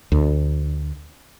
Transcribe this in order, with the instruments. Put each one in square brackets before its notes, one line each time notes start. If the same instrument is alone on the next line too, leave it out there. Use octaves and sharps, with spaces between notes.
[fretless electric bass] D2